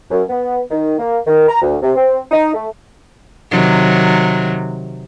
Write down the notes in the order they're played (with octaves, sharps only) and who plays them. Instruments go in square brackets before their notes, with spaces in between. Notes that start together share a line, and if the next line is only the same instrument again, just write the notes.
[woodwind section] F#2
B3
D#3
A#3
D#3
A#5
D2
C3
C4
D#4
A3
[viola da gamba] C3 D#3 F#3